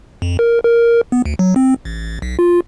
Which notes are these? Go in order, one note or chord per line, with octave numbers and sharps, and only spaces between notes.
F2
A#4
A#4
B3
D2
F#3
C4
A1
B1
F4